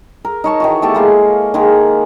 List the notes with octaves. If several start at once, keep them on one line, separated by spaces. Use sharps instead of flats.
A#4
D#4 C#5 A5
D#3 E3 F#4
A3 B3 G4 A5
G#3 A#3 F5
D#3 G#3 A#3 A#4